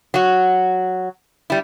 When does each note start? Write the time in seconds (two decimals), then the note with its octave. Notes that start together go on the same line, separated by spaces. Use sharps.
0.14 F#3 F#4
1.50 G3 E4